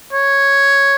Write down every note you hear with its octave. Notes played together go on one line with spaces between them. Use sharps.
C#5